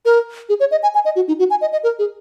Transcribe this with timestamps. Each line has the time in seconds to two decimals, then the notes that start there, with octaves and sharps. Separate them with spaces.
0.05 A#4
0.49 G#4
0.60 C#5
0.71 D#5
0.83 G#5
0.95 G#5
1.05 D#5
1.16 F#4
1.28 D#4
1.39 F#4
1.50 G#5
1.61 D#5
1.72 D#5
1.84 A#4
1.99 G#4